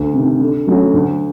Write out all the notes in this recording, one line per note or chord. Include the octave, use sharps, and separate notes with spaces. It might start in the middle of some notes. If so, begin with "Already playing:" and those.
Already playing: D2
C3 D#3
D3
F#3 A3 C#4 F#4
D2